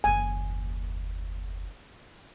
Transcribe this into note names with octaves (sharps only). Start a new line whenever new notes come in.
F#1 D#2 G#5